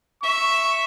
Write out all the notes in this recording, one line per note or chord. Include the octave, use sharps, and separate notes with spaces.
E5 C#6